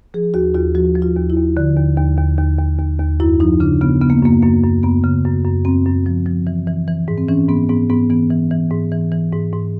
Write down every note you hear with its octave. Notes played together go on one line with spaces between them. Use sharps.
F3 G#4
D#2 F#4
D#2 F4
F3 F#4
F3
F4
D#2
E4
D#2
D3
D#2
D#2
D#2
D#2
D#2
D#2
D#2
F#2 E4
F3 D#4
C#3 D4
C#3 B3
C#3 B3
A#3
F#2 A#3
F#2 A#3
F#2
F#2 B3
C#3
F#2
F#2
F#2 C4
F#2
F3
F3
E3
E3
E3
G#2
C4
E3 C#4
G#2 B3
G#2 B3
G#2 B3
E3 B3
E3
E3
G#2
E3
E3
G#2
G#2